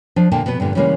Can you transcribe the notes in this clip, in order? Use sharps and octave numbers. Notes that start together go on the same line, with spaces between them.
F3 D4
A#2 D3 A#3 G5 A5
B2 B3
G2 A#2 D3
C#3 E3 G3 G#3 A#3 C#4